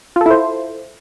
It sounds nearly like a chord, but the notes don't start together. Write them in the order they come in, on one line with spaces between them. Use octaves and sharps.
F4 A4 E4 C5